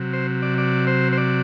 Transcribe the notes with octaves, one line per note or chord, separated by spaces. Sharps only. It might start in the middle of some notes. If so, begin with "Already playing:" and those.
Already playing: C3 F#3
C5
D5
D5
C5
C5
D5